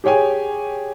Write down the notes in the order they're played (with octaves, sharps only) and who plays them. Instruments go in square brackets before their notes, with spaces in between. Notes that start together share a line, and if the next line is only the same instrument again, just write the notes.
[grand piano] G4 G#4 C#5 G5 G#5